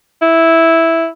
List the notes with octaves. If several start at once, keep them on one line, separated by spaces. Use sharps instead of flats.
E4